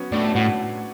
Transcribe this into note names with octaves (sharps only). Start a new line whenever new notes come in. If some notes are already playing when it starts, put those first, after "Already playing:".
Already playing: F#3 B3 C#4 F#4 C#5
A2 D4 D5
A2 F#4 F#5